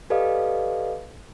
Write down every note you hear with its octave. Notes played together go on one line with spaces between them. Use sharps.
G4 A4 B4 D5 D#5 F5